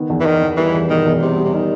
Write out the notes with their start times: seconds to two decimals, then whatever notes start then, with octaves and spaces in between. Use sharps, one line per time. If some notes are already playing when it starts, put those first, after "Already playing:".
Already playing: D#3 B3
0.10 E2
0.20 E3
0.25 E2 D#3
0.42 E2
0.57 E3 G3
0.74 E2
0.90 E1 D#3
1.06 E2
1.22 C3 G3
1.38 G3
1.45 C3
1.53 D#3 D#4